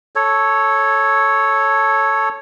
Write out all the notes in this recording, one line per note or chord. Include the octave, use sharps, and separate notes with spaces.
A4 C#5